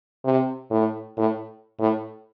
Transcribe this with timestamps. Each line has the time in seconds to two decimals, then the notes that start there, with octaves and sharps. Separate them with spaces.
0.25 C3
0.71 A2
1.17 A2
1.80 A2